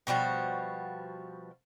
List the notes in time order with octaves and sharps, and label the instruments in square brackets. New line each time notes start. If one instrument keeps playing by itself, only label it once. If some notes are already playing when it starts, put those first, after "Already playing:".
[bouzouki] B2 F3 G3 F#4